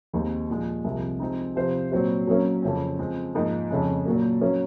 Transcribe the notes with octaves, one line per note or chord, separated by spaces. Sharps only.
D#2 D#3 G#3 C4 D#4
A#2 F3 G#3
C2 C3 F3 G#3
F3 G#3 C4 D#4
C3 F3 C4 F4 C5
A#2 F#3 C4 F#4 C5
F#3 A#3 C#4
F2 C#3 F3 C4
F3 G#3 C4
G#2 F3 A#3 D#4
F2 C#3 G#3
A#2 F#3 A#3
F#3 A#3 C#4